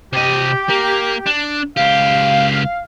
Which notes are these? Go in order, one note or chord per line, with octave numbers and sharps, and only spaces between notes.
C3 G4 D#5
A#3
D4
C#2 G4 F5